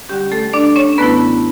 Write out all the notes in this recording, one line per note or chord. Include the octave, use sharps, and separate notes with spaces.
D2 D3 G3 C#4 G4
A3 A4
D4 D5
C#4 C#5
F#2 D3 A3 B3 C#4 E4 B4